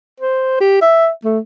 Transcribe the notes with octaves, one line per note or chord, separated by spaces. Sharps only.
C5
G4
E5
A3